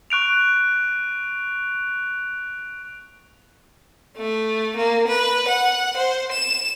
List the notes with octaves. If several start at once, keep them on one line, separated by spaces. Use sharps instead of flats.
C#6 F#6 D7 F7
A3
A#3
B4
F#5
C5
E7